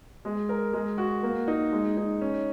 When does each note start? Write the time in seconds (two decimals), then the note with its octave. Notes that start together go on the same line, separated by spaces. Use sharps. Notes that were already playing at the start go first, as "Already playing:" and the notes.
0.25 G#3
0.49 A#4
0.73 G#3
0.98 F#4
1.23 A#3
1.48 D#4
1.72 G#3
1.97 D#4
2.21 C#4